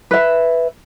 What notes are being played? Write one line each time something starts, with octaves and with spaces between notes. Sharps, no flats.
B4 E5